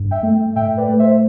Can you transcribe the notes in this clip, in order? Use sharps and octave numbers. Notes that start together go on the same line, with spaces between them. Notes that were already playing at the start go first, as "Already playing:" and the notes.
Already playing: G2
E5 G5
A3
A2 E5 G5
B4 D5
A3
C5 E5